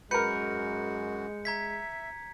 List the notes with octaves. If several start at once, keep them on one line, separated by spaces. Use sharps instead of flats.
F#2 G#3 F#4 A#4 B4 G6 C#7
E5 A#5 G#6 B6